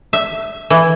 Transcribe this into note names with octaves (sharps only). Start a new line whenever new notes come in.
E5
E3